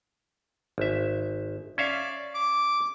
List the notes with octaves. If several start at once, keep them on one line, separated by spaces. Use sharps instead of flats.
G#1 E5
C#4 D5 E5 F5
D6